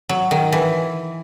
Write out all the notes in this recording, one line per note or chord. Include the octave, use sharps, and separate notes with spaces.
F#3
D#3
E3